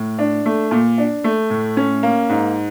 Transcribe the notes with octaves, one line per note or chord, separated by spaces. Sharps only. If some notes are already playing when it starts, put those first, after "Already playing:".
Already playing: A2
D4
A3
A#2
D4
A3
A2
C#4
A#3
G#2